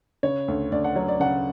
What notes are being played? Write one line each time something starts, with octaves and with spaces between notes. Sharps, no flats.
C#3 C#5
D2
D2 D5
F#5
F#3 C#5
D5
C#3 F#5